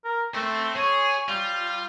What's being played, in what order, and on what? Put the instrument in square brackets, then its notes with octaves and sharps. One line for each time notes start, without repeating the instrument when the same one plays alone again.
[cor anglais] A#4
[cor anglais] A3 [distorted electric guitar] C4 C5
[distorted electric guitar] G#4 [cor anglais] C#5
[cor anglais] G3 [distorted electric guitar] F4